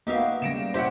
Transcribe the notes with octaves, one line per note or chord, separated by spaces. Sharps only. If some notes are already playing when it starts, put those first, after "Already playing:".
A#3 B3 D#4 F#4 G4 E5 F5
C#3 G3 A#6 D7 E7
B2 E4 G4 C5 C#5 E5 F#5